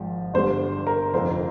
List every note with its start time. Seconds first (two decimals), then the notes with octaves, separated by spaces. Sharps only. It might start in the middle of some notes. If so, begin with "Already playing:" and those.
Already playing: G#1 G#2 F3
0.34 G1 G2 D3 G3 C5
0.87 A#4
1.13 F1 F2 D3 F3 C5